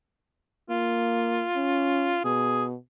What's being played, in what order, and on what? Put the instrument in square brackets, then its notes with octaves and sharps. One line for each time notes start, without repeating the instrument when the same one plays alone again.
[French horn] A#3 [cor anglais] F4
[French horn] C#4
[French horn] B2 [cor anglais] G#4